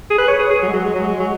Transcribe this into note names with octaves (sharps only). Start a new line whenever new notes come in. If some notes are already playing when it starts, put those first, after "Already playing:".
G#4
B4
C#5
G#4
G#4
F#3
G#3
F#3
G#3
F#3
G#3
F#3